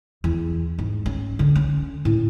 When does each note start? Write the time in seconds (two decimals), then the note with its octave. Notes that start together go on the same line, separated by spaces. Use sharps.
0.24 E2
0.79 G#2
1.06 C#4
1.39 D3
1.55 C#4
2.05 A2